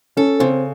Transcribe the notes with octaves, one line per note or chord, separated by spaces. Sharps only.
C#4 A4
C#3 C4